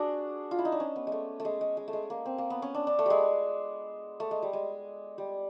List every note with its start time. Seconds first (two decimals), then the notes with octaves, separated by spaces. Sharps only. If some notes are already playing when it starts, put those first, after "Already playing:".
Already playing: D4 F#4 G#4
0.51 F4
0.58 E4
0.65 D#4
0.72 D4
0.80 C#4
0.96 B3
1.07 G#3 A3
1.40 A3
1.45 G#3
1.61 G#3
1.77 G#3
1.88 A3
1.93 G#3
2.10 A#3
2.25 C4
2.38 A#3
2.50 B3
2.62 C#4
2.74 D4
2.87 D4
2.99 A3
3.06 G3 G#3
4.20 A3
4.31 G#3
4.42 G3
4.53 G#3
5.18 G3